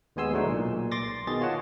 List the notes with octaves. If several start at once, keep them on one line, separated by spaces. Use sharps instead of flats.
D#2 G#3 B3 G#5 C6 E6
A2 F#3 G#3 A3 D4 D#4
B1 A#2
C6 D6 A6 A#6
B2 D#3 G#4 D#5 A6
F4 C#5 D#5 F#5 A5